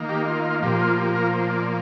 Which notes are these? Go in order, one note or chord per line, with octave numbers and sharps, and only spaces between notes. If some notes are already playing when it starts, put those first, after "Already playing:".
Already playing: D#3 A#3
G4
F4
F4
A#2 F3 A#3 G4
F4
G4
A#4
C5
D5